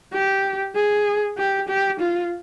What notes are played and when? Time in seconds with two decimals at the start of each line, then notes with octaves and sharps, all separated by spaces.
0.13 G4
0.75 G#4
1.37 G4
1.69 G4
2.00 F4